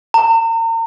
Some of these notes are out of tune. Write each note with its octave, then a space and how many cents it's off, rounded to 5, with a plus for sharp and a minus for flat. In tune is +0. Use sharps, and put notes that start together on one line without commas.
A#5 -40